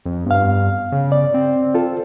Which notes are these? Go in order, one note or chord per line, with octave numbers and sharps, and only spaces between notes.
F2
G2 B3 F5
C#3
D5
C4
F4 A4